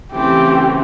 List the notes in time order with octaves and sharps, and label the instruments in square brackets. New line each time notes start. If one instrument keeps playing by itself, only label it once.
[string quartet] C#3 E3 A3 C4 [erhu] G4